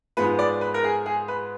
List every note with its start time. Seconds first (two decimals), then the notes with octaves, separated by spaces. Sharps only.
0.17 G#2 F3 G#3 B3 B4
0.39 D5
0.61 B4
0.74 A#4
0.84 G#4
1.06 G#4
1.28 B4